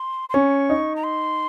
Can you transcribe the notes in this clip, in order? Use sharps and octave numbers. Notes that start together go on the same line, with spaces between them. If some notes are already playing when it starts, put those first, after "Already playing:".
Already playing: C6
C6
C#4 C#6
D#4
A#5
C6